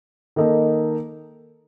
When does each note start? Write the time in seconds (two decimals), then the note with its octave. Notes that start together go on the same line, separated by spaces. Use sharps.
0.36 D#3 A#3 D#4 A4